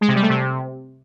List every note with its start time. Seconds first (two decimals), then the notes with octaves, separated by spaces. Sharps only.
0.01 G#3
0.08 C3
0.15 G3
0.22 A3
0.29 C3